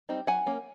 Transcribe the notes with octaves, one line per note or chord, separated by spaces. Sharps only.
G3 C4 D#4
F#3 F#5 G#5
A#3 C#4